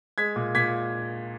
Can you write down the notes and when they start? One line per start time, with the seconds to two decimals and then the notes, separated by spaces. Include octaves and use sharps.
0.18 G#3 G#6 B6
0.36 A#2
0.55 A#2 G#6 B6